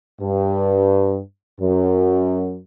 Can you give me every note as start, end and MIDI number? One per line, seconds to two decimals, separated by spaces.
0.21 1.19 43
1.60 2.61 42